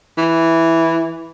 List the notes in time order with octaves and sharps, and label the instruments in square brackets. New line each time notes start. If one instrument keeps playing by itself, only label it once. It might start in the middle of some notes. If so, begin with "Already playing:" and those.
[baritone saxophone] E3